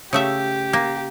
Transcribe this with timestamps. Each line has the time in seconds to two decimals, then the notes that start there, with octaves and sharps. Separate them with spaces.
0.13 C#3 A3 G4 E5
0.73 A#3